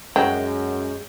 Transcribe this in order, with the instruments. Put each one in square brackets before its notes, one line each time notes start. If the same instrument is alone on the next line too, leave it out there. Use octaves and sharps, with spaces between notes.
[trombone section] F#2 [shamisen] F#3 [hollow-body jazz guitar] G#3 [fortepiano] G5